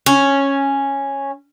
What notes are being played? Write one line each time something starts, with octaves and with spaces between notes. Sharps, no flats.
C#4